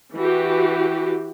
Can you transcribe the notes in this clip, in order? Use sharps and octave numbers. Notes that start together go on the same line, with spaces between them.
E3 F#4 G4